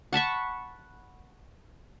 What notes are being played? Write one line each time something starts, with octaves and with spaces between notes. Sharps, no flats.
F#5 A5 B5 C#6